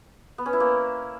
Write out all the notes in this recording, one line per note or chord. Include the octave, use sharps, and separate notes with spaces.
B3
C#4
E4
A#3